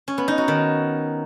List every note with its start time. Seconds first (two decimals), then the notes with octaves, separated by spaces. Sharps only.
0.08 C#4
0.18 B3
0.28 D#4
0.38 F#4
0.48 D#3